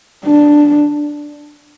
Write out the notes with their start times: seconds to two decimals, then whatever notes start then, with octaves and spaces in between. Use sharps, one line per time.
0.25 D4